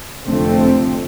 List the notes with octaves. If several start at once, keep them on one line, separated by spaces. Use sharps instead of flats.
F1 F2 D3 A3 C4